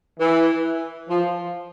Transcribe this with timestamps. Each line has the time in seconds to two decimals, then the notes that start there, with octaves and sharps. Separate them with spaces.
0.19 E3
1.09 F3